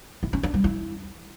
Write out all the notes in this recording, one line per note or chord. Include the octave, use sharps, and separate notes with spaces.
E4
C#4
D4
G3
E4